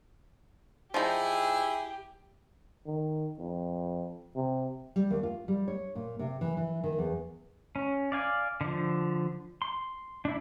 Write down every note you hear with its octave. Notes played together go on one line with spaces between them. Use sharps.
F3 D#4 E4 G4 G#4
D#3
F2
C3
G3
D#2
F4
G3
C#5
A#2
C3
E3
E3
D#3
E2
C#4
D5 F5 G#5
D3 F3
C6
D4 E4